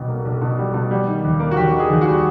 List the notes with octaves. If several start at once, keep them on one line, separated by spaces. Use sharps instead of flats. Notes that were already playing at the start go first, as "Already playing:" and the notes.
Already playing: B1 B2 G3
A#3
B1
B2
G3
B2
G3
D#3
D#2
A#3
F#4
D#2 G4
D#3
G#4
D#2
F#4
G3